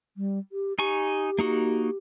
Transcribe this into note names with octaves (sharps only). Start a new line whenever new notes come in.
G3
G4
D#4 G4 G#5 C#6
A#3 D#4 F#4